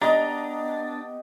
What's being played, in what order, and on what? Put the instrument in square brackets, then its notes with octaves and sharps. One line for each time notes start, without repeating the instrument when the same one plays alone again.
[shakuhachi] B3 [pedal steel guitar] D4 [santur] G4 D#5 [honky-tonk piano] A#5